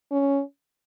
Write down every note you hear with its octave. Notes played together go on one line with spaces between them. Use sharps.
C#4